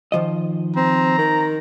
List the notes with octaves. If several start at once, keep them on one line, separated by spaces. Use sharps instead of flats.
D#3 F3 D#5
C4 A#5
D#3